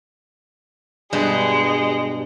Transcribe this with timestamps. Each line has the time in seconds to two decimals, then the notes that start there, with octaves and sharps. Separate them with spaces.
1.13 G2 B2 G3 G#3